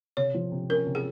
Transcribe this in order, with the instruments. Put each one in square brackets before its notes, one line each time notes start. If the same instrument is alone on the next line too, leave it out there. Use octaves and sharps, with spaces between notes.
[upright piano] C3 [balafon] C#5
[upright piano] F3
C3
[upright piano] C#4 [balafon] A#4
[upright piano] C3
[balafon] G#4